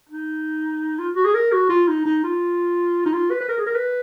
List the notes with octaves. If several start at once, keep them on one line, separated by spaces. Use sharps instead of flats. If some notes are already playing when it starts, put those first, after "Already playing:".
D#4
F4
F#4
G#4
A#4
F#4
F4
D#4
D#4
F4
D#4
F4
B4
B4
A#4
G#4
A#4
B4